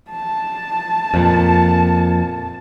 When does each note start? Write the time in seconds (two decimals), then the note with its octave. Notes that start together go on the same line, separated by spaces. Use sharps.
0.10 A5
1.14 F2 A#2